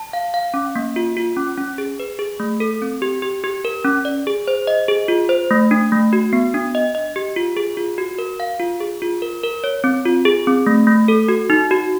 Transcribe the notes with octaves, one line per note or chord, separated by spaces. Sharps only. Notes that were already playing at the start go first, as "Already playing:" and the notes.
Already playing: A5
F5
F5
C#4
A#3
F4
F4
C#4
C#4
G#4
B4
G#4
A3
A4
C4
G4
G4
G4
A#4
C#4
D5
G#4
C5
D#5
G#4
F4
C5
A3
D4
A3
F#4
B3
D4
D#5
D#5
G4
F4
G#4
F4
F#4
A#4
F5
F4
G#4
F4
A#4
A#4
C#5
C4
F4
G#4
C4
A3
A3
A4
F#4
D#4
F#4